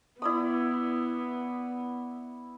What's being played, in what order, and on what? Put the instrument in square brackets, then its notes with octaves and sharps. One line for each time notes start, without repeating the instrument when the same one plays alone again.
[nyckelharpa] B3 [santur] E4 D5 D#6